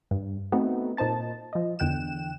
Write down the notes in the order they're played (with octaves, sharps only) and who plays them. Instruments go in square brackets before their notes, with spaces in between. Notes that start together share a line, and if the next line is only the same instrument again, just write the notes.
[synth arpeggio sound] G2
A3 B3 C4 D#4 F#4
A#2 D#4 C5 A5 A6
F3 D#5
E2 D3 G5 F#6 E7